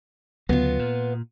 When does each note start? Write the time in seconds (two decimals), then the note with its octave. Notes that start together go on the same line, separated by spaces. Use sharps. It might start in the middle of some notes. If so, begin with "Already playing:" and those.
0.49 D2 C#3 F#3 B3 F4
0.79 A#2